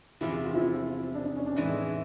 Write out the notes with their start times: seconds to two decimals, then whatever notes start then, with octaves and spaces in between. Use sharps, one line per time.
0.21 E2 C3 F3 E4
0.44 F4
0.54 E4
1.15 D4
1.22 D#4
1.36 C#4
1.46 D4
1.56 A2 E3 G#3 D#4